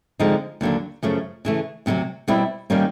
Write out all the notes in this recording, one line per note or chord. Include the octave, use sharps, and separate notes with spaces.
D3 F3 G#3 C4 D#4
D#2 D3 F#3 A#3 D4
F#2 C#3 F3 A3 C#4
C#3 E3 A3
D2 C3 D#3 F#3
B2 G3 C4 E4
D#3 G3 A#3 C#4